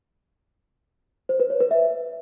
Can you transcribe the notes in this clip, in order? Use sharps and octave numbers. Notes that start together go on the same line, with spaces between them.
C5
B4
C#5
B4
E5